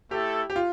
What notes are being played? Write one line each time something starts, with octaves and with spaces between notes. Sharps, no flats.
A3 E4 G4 A4
G4
F4